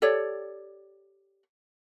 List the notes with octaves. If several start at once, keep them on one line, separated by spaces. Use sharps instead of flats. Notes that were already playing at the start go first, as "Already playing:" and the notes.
G4 A4 C#5 D5